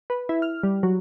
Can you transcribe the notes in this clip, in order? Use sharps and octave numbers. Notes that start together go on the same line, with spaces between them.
B4
E4
F6
G3
F#3